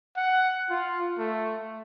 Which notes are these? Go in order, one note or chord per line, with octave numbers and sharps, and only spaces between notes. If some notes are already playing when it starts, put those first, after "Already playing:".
F#5
F4
A3